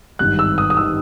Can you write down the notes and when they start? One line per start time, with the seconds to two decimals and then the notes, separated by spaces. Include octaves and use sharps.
0.19 G#1 G2 D#3 F#6
0.39 E6
0.58 D#6
0.70 D#6
0.77 D#3 E6